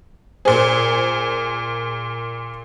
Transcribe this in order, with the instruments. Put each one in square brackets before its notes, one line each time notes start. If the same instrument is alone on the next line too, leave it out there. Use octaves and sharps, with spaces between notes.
[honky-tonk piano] A#2 G#4 [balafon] C5